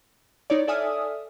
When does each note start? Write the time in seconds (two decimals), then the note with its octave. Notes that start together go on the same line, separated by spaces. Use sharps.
0.50 D#4 E4 C#5 D5
0.67 A4 D5 E5 G#5 D#6 F6